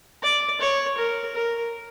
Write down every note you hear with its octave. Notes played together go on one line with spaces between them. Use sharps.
D5
C#5
A#4
A#4